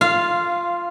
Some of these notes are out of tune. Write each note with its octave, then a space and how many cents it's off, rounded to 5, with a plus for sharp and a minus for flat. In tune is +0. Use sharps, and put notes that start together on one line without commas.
F4 +0 F5 -15